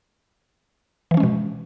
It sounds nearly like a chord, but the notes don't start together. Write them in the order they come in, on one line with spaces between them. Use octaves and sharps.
E3 F3 C#4 G#3 B2